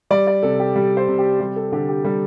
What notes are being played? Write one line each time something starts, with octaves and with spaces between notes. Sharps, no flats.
G3 D5
D5
C3 A4
G4
G3
C5
C3
G4
G3 G4
A4
D3 G4
G4
G3 A4